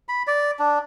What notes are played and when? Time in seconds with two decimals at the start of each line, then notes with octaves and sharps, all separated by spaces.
0.09 B5
0.27 D5
0.59 D4